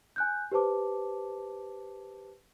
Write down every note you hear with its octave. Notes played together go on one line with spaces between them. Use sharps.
G#5 F#6 G6
G4 B4 C5 A5 D6